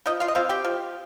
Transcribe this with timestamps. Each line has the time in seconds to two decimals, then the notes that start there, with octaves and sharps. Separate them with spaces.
0.06 F3 D#4 D#5
0.20 F4 F5
0.28 D#5
0.35 C4 F4 F5
0.49 G4 G5
0.64 F3